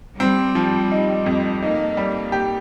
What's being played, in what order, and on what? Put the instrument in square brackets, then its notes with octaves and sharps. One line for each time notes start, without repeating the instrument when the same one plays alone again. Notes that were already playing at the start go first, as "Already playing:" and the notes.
[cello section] G3 [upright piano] C4
[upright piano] F3
D#4
F2
[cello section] A#3 [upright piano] D#4
[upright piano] G3
G4